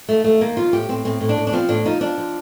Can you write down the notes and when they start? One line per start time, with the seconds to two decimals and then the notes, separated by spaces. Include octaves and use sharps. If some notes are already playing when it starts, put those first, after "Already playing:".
0.09 D#2 A3
0.24 D#2 A3
0.41 D#3 A#3
0.57 F3 F4
0.73 A2 G4
0.89 A2 C4
1.05 A2 C4
1.21 A2
1.29 D4
1.37 A2
1.47 D4
1.53 F3 C4
1.69 A2 D4
1.86 F3 D#4
2.01 F3 D4
2.18 F3